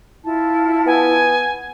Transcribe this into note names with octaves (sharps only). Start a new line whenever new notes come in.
E4 F4 A5
B3 G#5